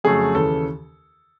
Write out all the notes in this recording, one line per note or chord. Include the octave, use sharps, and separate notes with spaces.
F2 C#3 F#3 A3 G#4
D#2 C#3 E3 A4